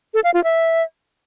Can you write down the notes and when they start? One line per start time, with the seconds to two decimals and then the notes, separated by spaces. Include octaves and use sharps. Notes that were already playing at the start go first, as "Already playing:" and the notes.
0.14 A4
0.24 F5
0.34 F4
0.44 E5